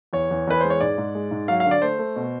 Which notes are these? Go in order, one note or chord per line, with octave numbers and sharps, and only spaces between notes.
E2 C#5
E2
E2 B4
G#3 C5
C#5
G#2 D5
G#2
G#3
G#2
F#3 F5
F5
D3
D5
A3 C5
A3
B2